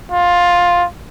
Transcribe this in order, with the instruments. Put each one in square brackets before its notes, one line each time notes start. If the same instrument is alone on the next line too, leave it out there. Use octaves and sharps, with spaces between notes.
[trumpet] F4